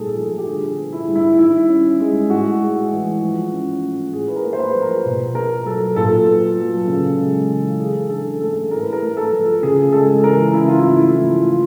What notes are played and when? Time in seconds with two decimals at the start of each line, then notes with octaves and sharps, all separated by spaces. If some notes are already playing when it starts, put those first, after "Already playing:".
Already playing: A#2 D#3 G3 A3 G#4 A4
0.16 F3 A4
0.38 G4
0.47 D3 G#4
0.77 B3
0.92 E4
1.08 G3
1.15 E4
1.39 D#3 E4
1.69 C#4
2.00 G#3
2.30 A2 F#4
2.61 G#3
2.92 E3
3.22 F3
3.53 C#4
3.82 A3
4.13 A2 G#4
4.28 B4
4.36 A#4
4.44 A#3
4.53 C5
4.59 B4
4.75 F3
4.82 A#4
5.05 B2
5.35 B3 A#4
5.65 F#3 A4
5.96 A#2 A4
6.26 B3
6.57 F#3
6.87 C#3
7.18 G#3
7.49 E3
7.79 E3 G#4
8.09 D4 A4
8.41 A3 A4
8.71 A2 A#4
8.82 B4
8.93 A#4
9.01 A3
9.17 A4
9.32 F3
9.62 C#3 G#4
9.92 G#3 A4
10.24 E3 A#4
10.54 C#3 E4
10.67 F4
10.79 E4
10.85 A3
11.00 E4
11.15 F3
11.46 F3 F4